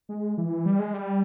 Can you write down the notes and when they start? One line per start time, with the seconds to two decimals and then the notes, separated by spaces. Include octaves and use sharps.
0.09 G#3
0.38 E3
0.66 G3
0.79 G#3
0.94 G3